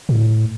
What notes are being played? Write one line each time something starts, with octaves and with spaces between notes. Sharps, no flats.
A2